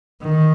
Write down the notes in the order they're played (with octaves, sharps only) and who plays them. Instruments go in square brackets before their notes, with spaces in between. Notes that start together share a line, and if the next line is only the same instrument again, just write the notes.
[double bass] D#3